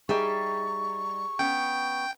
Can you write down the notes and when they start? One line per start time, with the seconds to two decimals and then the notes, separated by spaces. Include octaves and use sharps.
0.09 G3 D#4 G4 G#4 E5 C#6
1.39 B3 C#4 G5